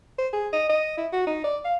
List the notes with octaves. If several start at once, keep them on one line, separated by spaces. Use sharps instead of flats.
C5
G#4
D#5
D#5
E4
F#4
D#4
D5
F5